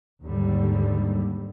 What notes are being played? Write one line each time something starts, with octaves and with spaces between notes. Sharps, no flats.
D#2 G#2 D3 G3